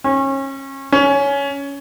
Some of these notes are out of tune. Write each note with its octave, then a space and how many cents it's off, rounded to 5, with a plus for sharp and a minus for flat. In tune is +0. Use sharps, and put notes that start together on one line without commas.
C#4 -30
C#4 +15